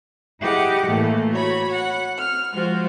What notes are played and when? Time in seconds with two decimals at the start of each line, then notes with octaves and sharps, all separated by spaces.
0.40 E4 G4 G#4 D#5 F#5
0.86 A2 E3 A3 A#3
1.30 F#4 C#5 B5
1.71 F#5
2.17 F6
2.51 F3 G#3 F4 F#4 C5